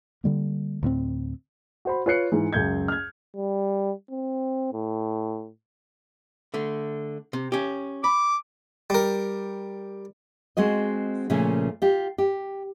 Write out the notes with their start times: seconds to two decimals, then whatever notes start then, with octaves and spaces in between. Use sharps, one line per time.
0.24 D3 G3 A#3
0.83 D2 A2 B3 C4
1.85 F#4 C5 B5
2.06 F4 B4 C#5 F#6 C7 C#7
2.32 G#2 E3
2.53 C#2 F#2 G6 G#6
2.88 F6 G#6
3.36 G3
4.11 C4
4.73 A2
6.54 D3 A3
7.33 C3
7.52 C#4 G4
8.04 B5 D6
8.90 G3 A#4
10.57 G#3 C4 F#4 D#5
11.30 A#2 C#3 F3 A3 C#4
11.82 F4 G4
12.18 G4